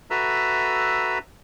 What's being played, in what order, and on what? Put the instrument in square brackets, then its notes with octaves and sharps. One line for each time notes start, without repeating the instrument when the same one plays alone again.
[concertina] F#4 A4 B4 E5 A#5 E6